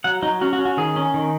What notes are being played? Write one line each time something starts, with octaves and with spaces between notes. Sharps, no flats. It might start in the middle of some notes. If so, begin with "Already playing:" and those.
F#3 F#5
F#3 D#4
C#4 F#4
F#4
C#4
F#4
D#3 G#4
C#4
D#3